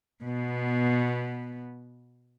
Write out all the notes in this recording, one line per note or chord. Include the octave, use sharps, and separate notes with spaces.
B2 B3